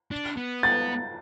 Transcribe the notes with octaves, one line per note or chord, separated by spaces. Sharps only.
D4
B3
A6